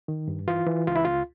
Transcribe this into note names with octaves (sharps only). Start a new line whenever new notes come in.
D#3
G2
E3 F4
E3
C#2 F4
E4
C#2 F4